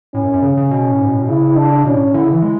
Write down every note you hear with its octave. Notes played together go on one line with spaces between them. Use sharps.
A2 C#4
F#2
F#2
C#3 C#4
C#3
B2
A2
G#2
B2
A2
B2
C#3 E4
D4
B2 C#4
A2
D3 E4
C#3
E3
G#3